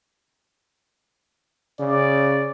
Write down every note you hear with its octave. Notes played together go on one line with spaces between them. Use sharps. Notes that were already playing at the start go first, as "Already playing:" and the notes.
C#3 D5